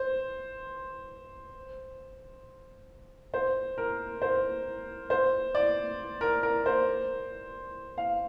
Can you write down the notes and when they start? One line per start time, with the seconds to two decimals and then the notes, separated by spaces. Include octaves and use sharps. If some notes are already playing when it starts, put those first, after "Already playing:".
Already playing: C5
3.34 C5
3.78 A#4
4.22 C5
5.10 C5
5.55 D5
6.21 A#4
6.43 A#4
6.66 C5
7.98 F5